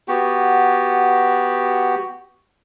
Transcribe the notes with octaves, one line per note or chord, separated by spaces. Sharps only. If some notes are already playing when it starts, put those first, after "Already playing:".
B3 F#4 G4